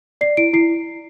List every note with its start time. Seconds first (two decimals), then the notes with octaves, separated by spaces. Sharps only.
0.21 D5 C7
0.37 E4 D7
0.53 E4 C7